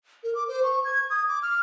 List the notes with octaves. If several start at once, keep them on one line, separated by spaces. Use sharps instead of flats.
A#4
D6
C5
C#6
G#6
D#6
D6
F6